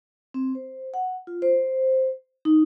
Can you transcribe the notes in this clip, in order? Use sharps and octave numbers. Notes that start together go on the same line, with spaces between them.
C4
C5
F#5
F4
C5
D#4